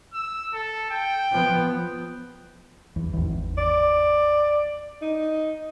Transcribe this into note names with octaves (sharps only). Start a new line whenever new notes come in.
E6
A4
G5
F3 B3
E2
G#1 E2
D5
D#4